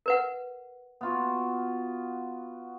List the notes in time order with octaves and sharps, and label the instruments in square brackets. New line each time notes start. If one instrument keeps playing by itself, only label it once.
[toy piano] A#4 B4 F#5
[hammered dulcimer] B3 F4 F#4